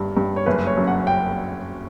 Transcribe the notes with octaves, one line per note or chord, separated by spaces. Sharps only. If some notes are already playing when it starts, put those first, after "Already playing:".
Already playing: G1 G2
G2
C#5
F#1 B4
C#5
F#2
F#5
G5